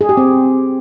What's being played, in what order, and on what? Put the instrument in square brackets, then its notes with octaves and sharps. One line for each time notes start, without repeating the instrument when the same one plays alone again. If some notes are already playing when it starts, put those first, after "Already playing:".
[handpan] G#4
G4
C4